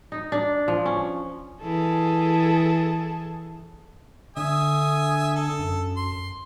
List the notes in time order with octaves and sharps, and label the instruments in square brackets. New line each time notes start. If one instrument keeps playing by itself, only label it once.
[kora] D#4
D4
F3
C#4
[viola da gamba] E3 G#4 A4
[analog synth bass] D3 [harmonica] E5 G#5 D#6
[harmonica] A4
[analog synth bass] F#2
[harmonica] C6